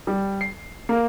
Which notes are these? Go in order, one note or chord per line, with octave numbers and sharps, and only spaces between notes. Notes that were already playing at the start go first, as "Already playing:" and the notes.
G3
C7
A#3